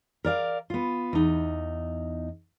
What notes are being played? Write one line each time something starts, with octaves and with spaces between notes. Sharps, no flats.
A#4 D5 F5
B3 F4
E2 D#4